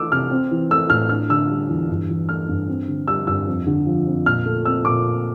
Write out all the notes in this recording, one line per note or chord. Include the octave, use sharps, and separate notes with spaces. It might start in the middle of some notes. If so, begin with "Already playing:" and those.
Already playing: E3 A3 D4 D6 E6
C3 F6
C4
E3
A3 E6
A2 F6
D4 F6
D3 E6
G3
E2
G2
E3
A3 F6
G2
C4
D3
G3 E6
G2 E6
F2
D3
F3
F2
A#2 F6
A3
C4 E6
A#2 D6